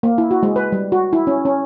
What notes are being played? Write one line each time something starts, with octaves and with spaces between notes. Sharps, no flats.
A#3
E4
F#4
G#3
B4
G3
F#4
E4
C#4
C#4